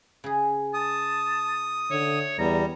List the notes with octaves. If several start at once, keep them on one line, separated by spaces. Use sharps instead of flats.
C#3 G#4
A5 D#6
D3 C#5 E5
E2 G3 A#5